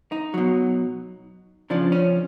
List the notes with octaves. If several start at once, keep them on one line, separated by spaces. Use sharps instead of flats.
D#4
B2 F#3
C#3 F3 D4
C#4